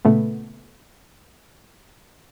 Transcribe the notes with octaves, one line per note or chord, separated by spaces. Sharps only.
A#2 C#3 A3 B3